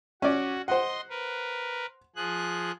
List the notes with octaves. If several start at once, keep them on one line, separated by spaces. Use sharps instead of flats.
C#4 F#4 D5
C5 D#5 F#5 C6
A#4 B4
F3 G#4 F#6